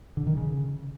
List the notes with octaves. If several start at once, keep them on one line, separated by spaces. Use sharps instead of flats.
D3
D#3
C#3